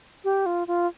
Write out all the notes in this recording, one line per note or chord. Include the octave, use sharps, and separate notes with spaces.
G4
F4
F4